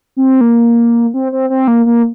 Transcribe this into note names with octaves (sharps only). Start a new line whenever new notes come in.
C4
A#3
C4
C4
C4
A#3
A#3